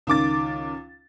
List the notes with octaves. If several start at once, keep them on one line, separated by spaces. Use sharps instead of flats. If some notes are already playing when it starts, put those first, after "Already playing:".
C#2 D#3 D6 A6